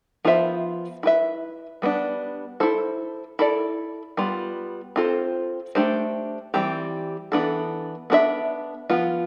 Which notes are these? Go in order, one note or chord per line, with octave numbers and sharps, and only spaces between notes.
F3 B3 F4 C5 E5
E4 B4 E5
G3 B3 D4
E4 A4 C5
E4 A4 D5
G3 B3 F4
C4 F4 A4 C5
A3 D4 G4 C5
E3 G3 C4 G4
E3 B3 D4 A4
B3 D4 A4 E5
F3 B3 F4